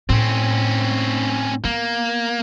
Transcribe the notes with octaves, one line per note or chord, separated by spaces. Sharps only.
A2 C4 C#4
A#3 B3